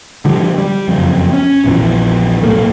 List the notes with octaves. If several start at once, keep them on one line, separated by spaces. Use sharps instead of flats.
D3 F3 G3
G3
F#1 F2
C#4
A#1 E2 E3 F3
D1 B1 A3 A#3